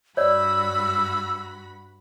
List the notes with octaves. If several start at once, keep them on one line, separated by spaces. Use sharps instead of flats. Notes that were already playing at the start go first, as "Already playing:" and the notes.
G2 F#4 C#5 D5 B5 E6